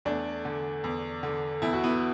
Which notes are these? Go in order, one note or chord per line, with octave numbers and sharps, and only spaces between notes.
E2 A3 D4
D3
E2
D3
E2 E4
F#4
B3 E4